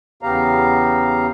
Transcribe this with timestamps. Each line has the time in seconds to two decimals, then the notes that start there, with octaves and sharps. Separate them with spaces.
0.23 E2 C#3 B3 G4 F5 A#5